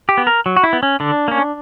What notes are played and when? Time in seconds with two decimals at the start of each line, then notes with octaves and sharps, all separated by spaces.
0.09 G4
0.18 B3
0.27 A#4
0.46 F#3
0.56 F#4
0.64 E4
0.73 B3
0.83 C#4
1.00 D3 D4
1.28 A#3 C#4